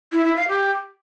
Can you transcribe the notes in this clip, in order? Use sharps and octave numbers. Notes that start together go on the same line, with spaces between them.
E4
E4
F5
G4